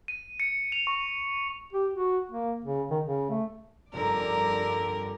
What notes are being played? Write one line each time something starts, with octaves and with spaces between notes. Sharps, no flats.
D#7
C#7
F7
C#6
G4
F#4
A#3
C#3
D#3
C#3
A3
F1 G2 D3 G4 A#4 D5 A#5